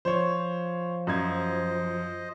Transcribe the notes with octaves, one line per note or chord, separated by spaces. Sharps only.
F3 C5 C#5
F#2 C5 D#5 G#6